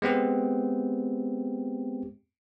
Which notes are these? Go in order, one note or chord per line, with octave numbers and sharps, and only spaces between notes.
G#3 B3 C4 G4